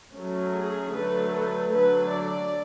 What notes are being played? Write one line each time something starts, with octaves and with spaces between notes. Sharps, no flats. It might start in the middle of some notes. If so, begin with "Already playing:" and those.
F#3 A3 C#4
G#4
D3 F#3 A3 B4
B4
D3 F#3 A3 D4 B4
D5